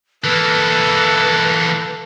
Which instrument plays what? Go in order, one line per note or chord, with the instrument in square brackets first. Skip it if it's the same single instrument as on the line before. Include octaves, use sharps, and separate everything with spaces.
[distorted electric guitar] E3 A#3 [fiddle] A4 [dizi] B4